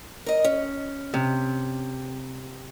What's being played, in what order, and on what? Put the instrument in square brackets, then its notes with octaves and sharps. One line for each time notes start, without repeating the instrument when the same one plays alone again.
[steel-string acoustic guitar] A#4 D#5
C#4
[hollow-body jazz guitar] C3